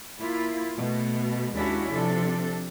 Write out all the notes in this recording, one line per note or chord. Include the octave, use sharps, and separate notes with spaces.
A#3 E4 F4
B2 A3
D#2 G#3 C#4 D4 E4 F#4
C3 F3 D4 A4